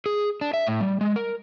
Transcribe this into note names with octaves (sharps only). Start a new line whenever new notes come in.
G#4
D4
E5
A2
G3
G#3
A#4